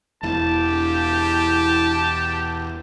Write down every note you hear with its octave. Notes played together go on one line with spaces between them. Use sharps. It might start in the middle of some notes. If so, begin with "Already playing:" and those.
E1 E4 G4 A5